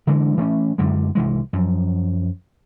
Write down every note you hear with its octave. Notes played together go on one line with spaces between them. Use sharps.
D3 E3 G#3
E3 A3 C#4
F#2 D3 G#3
C2 E3 G#3
F#2 F3